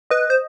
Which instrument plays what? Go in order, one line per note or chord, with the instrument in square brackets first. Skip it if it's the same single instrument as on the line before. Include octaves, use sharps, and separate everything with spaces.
[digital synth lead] B4 [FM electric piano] D#5
[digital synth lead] C5